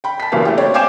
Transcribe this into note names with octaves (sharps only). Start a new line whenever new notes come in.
G5 B5
A5 B6
F#1 B2 E3 G3 A#3 F5
A3 G4
C4 C#5 D5
F5 G5 G#5 D6 G6 E7